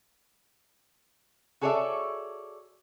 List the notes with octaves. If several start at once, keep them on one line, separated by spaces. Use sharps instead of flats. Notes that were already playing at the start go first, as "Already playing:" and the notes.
F#4 G#4 A4 C#5 D5 E5